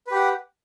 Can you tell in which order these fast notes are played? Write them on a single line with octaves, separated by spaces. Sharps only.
B4 G4 F#5